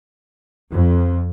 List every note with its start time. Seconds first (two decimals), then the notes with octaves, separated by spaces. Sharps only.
0.73 F2